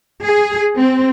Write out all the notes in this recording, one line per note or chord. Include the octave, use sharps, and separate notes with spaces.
G#4
C4